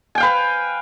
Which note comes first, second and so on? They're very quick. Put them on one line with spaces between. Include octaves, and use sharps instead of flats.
G#5 G5 F5 B4